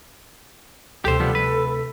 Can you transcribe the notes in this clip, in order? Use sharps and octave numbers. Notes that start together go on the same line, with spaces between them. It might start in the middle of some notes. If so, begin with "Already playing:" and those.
D2 C3 G4 A4 C5
F3 G3 B3
B4